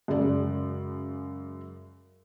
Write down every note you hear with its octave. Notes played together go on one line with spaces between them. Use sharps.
F#2 C#3 G#3 D5